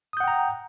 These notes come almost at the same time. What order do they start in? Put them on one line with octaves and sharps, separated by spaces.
D#6 G6 F#5 G5 A#5